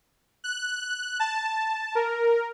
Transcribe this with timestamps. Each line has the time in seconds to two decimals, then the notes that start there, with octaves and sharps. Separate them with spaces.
0.44 F#6
1.20 A5
1.95 A#4